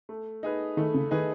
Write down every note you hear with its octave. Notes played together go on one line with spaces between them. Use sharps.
A3
D#4 G#4 B4
D#3 A3
C#3
D#3 D#4 G#4 B4